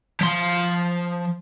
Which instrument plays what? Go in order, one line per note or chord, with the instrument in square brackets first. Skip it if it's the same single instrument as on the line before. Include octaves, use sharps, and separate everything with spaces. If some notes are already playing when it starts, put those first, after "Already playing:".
[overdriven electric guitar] F3 C6